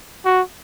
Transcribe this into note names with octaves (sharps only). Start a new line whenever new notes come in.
F#4